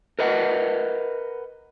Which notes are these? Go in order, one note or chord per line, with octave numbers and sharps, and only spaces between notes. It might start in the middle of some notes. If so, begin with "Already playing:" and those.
A#4 B4 D#5 F#5